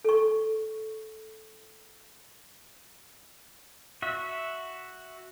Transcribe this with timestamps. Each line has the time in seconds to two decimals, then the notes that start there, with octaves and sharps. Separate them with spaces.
0.05 A4 C#6
4.02 F#4 E5